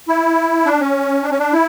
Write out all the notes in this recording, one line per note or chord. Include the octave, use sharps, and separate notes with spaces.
E4
D4
C#4
D4
C#4
D4
E4